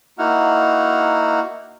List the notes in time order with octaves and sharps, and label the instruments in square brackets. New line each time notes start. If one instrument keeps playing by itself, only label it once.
[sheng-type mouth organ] A#3 D#4 E4 F#4 F#5 F6